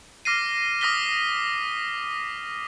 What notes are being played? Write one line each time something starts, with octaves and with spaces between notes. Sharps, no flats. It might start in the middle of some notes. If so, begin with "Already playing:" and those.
D6 F6 A#6 C7 D#7
D6 D#6 F6 A#6 B6 G7